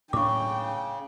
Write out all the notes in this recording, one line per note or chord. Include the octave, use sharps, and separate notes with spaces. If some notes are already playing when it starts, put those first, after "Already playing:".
A2 C#3 D4 G5 C#6 D6